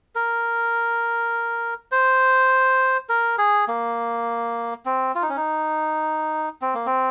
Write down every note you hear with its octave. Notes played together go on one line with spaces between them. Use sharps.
A#4
C5
A#4
G#4
A#3
C4
F4
D#4
C#4
D#4
C4
A#3
C4